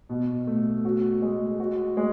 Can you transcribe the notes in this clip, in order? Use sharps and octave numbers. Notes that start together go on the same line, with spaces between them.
B2
A3
F#4
G#3
F#4
G#3